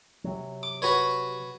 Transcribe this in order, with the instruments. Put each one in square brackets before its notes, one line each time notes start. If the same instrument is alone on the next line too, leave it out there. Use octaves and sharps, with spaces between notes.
[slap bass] C3 F#3
[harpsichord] D6
F#4 B4 C#5